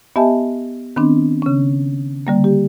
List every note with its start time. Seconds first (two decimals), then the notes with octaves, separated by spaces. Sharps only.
0.16 B3 G4 D#5 E5 G#5 A5
0.96 D#3 B3 C4 D4
1.42 C#3 C#4
2.27 D3 G3 A#3
2.44 G4